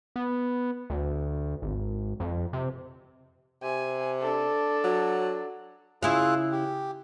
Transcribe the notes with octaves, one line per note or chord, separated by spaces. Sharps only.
B3
D2
G#1
F2
C3
C3 G#5
D4 A4
F#3
C#3 E4 F4 G#4 F5 F#6
G4